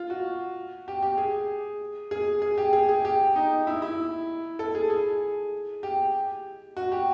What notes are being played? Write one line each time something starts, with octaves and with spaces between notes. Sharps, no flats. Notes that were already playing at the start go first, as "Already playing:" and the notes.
Already playing: F4
F#4
G4
G4
G#4
G#4
G#4
G4
G#4
G#4
G4
D#4
E4
E4
A4
G#4
G#4
G4
F#4
G4